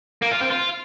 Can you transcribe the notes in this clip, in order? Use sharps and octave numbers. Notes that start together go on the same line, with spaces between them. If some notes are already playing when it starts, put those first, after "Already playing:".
A#3
F4
C4
F4